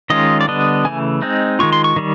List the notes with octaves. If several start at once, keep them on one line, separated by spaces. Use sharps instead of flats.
D#3 G#3 C#4 F4 D#5
D5
D3 G3 B3 D4 D#5
C#3 E3 A3 G#5
G#3 C4 D#4
D#3 G#3 C#4 F4 C#6
C6
C#6
D#3 G3